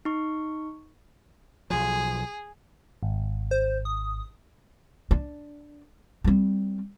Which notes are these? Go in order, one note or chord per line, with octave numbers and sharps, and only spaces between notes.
D#4 C#6
B1 F3 G#4
G#1
C5
D#6
D4
G3 C4